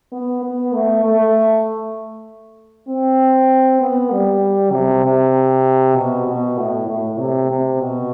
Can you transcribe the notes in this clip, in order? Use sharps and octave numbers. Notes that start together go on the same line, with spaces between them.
B3
B3
A3
A3
C4
B3
G3
C3
C3
B2
B2
A2
A2
C3
C3
B2